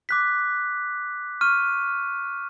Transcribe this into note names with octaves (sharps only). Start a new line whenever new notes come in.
D6 F#6 B6
C#6 F6 D#7